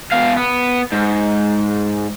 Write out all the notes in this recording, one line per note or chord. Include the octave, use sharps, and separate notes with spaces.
B2 F5
B3
G#2